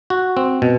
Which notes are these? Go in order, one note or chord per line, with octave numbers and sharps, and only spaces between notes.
F#4
C4
B2